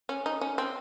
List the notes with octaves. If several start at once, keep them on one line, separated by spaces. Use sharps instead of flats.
C#4
D#4
C#4
C4